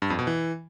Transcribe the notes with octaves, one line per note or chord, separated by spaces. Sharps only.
G2
F2
B2
E3